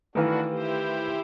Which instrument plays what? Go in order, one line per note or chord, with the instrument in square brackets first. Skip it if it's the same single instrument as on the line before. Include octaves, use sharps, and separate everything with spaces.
[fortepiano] D#3 E3 [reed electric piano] A3 B4 F5 [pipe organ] D4 F#4
[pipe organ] E4 G4 C5